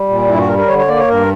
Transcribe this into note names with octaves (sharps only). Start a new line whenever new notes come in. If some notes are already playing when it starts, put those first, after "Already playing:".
Already playing: G3
A#2
G2 E4
F#4
G3 A#4
A#4
D3 C#5
C#5
A#3 D5
C#5
G2 A#4